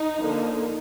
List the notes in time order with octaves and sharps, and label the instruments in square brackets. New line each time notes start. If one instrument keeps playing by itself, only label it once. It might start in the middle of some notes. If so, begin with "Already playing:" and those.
Already playing: [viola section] D#4
D3 F3 A#3 D4